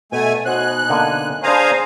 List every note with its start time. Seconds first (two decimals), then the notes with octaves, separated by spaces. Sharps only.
0.12 B2 A3 G#5
0.46 B2 D#4 F#4 C5 G#5 F#6
0.90 D3 A#3 F#5
1.43 D4 G#4 B4 C5 F5 G#5 A#5